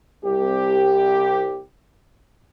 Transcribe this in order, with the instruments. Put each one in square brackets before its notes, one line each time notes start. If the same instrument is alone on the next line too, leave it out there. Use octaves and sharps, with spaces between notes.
[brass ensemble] C2 G4